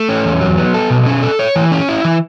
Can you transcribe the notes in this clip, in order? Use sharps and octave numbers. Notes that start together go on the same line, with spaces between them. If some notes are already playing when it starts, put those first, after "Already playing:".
Already playing: A3
C#4
E2
F#3
B3
A4
B2
C#4
A4
C#5
E3
C#4
E4
E3